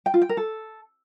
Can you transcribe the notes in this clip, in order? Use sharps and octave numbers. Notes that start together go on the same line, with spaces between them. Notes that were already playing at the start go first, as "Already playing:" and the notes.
G5
F4
G5
A#4
A4